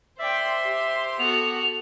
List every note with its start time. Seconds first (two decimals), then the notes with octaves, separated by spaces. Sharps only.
0.19 C5 D5 E5 G5 C6
0.64 G4
1.19 B3 F#4 A4 F7